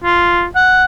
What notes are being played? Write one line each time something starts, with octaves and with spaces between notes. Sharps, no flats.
F4
F#5